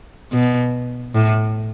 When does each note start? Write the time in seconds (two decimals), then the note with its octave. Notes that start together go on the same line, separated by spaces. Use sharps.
0.32 B2
1.15 A2